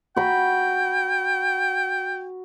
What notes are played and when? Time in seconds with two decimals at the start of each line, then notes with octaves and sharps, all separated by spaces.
0.16 F#4 G5 B5